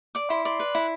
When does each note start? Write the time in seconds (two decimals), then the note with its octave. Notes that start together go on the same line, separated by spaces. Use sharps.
0.15 D5 D6
0.30 E4 C6
0.45 D5 C6
0.60 B4
0.75 E4